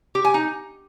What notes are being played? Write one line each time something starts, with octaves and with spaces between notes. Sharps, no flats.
G4
G#5
D#4